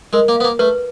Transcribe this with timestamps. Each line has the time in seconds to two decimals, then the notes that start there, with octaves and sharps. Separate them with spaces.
0.13 G#3 A#4
0.28 A#3
0.36 B3 F5
0.44 A#3
0.59 A3 B4